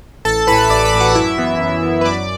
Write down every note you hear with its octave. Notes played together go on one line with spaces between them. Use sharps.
A1 A4 A5
A2 E3 B4 B5
A1 D5 D6
B4 B5
A2 E3
F#4 F#5
F#2 E4 E5
E3 B3
F#2
E3 B3
B4
F#2 D5